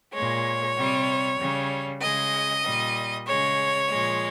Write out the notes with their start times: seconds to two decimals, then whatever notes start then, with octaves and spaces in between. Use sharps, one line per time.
0.13 A#2 G#3 C#5
0.76 C3 G3
1.38 C#3 G3
2.01 C#3 G#3 D#5
2.64 A#2 G3
3.26 C#3 G#3 C#5
3.89 A#2 F3 G#3